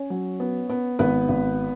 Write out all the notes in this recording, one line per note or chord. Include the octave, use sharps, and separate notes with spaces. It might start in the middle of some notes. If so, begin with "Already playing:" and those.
Already playing: C#4 C#5
F#3
B3
B3
G#1 B3 B4
G#1